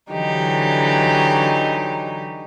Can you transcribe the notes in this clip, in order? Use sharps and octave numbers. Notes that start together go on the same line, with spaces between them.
D3 E3 F#3 D#4 G4